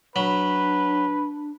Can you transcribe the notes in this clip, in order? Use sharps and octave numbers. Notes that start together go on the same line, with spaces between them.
F#3 D4 B4 B5